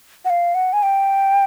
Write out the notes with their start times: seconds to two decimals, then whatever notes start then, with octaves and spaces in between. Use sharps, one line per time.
0.25 F#5
0.30 F5
0.55 F#5
0.73 G#5
0.83 G5